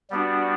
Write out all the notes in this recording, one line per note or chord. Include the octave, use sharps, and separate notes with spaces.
G3 B3 D4 F#4